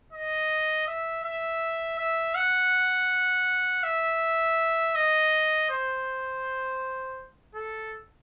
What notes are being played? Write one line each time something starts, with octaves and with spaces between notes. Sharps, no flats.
D#5
E5
E5
E5
F#5
E5
D#5
C5
A4